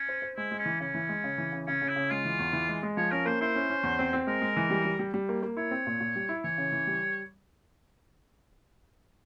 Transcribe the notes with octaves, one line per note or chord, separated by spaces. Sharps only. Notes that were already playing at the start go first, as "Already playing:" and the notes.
Already playing: C#4
C5
C5
G#3 E4
G#3
C#4
E3
C#3 C#4
E3
G#3
C#3
E3
C#3
C#3 C#4
C#3
E4
C#3
G#3 F4
E3
E2
E3
G#3
G#3
F3 C#5
C#4 A#4
A#3 C5
E4 C5
C#4
C#4
E2
C4
C4
G#3 A#4
G#3
E3
G3
G3
G3
G3
A#3
A#3
E4 C#5
C4
A#2
A#2
G3
E4
E3 C#5
C#3
E3
G3